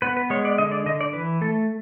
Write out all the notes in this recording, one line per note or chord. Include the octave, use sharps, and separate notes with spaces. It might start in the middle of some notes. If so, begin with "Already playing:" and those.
B3 B4
B4
G#3 C#5
D5
D3 D#5
D5
D3 D#5
D5
E3 B4
A3 A4